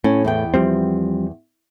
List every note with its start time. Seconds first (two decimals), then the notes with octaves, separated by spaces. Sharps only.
0.04 A2 C#4
0.24 E2 B3 G5
0.54 F3 G3 C4